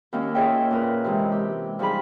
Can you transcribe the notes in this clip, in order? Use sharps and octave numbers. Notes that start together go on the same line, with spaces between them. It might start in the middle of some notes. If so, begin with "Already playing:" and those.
D#2 A#3 C#4
F4 G#4 C#5 D#5 E5 G5
A#2 A#4 B4
C3 E3 G#3
G4
F3 G3 D#4 G#4 B5